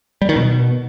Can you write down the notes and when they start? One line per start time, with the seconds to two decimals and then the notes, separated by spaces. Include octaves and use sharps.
0.22 G3
0.29 D#3
0.36 B2